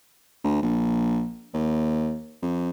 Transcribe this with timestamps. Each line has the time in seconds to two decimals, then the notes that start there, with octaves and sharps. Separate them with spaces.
0.44 D2
0.63 A#1
1.54 D#2
2.42 F2